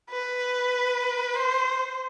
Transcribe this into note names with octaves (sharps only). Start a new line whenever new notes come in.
B4
C5